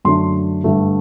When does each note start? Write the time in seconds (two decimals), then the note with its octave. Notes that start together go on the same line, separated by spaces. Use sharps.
0.05 F#2 D3 A3 D4 C6
0.64 G2 D3 A3